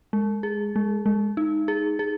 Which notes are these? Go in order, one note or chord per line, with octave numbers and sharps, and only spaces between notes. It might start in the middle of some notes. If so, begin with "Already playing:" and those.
G#3
G#4
G#3
G#3
D#4
G#4
G#4